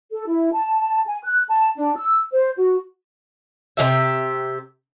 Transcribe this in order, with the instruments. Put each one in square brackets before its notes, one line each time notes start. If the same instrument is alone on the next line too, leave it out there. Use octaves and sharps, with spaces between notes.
[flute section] A4
E4
A5
G#5
F#6
A5
D4
E6
C5
F#4
[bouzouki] C3 F#3 G4 E5